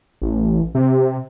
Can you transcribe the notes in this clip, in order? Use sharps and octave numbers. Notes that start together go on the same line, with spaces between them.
A1
C3